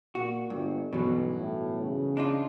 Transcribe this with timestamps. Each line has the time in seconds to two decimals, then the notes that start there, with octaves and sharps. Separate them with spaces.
0.15 A#2 F#4
0.50 G1 G2
0.93 B1 G2 B2 E3 F#3 C#4
1.38 A2
1.83 C#3
2.17 D4 D#4 F4